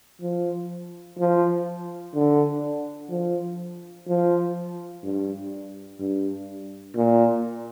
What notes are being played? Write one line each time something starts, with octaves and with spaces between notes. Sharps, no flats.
F3
F3
D3
F3
F3
G2
G2
A#2